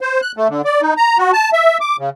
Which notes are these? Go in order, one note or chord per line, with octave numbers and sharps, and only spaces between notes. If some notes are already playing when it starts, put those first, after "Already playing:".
C5
F#6
A3
D3
D5
D#4
A#5
F#4
A5
E5
D6
C#3